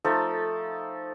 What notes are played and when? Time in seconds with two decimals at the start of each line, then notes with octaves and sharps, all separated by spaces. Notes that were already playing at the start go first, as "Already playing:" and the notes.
0.05 F3 A3 D#4 A4